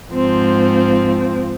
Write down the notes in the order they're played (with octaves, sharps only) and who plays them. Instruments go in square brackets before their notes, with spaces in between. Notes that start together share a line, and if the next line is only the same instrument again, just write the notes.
[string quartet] G#2 F3 C4